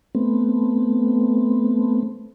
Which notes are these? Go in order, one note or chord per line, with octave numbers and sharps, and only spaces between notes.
A3 B3 C4